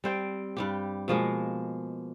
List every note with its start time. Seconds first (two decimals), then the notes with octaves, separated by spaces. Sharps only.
0.04 G3 C4 G5
0.57 G2 G3 G4
1.08 B2 F3 G#3 A#3